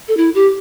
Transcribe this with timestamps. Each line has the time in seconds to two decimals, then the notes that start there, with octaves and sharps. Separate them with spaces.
0.08 A4
0.17 E4
0.35 G4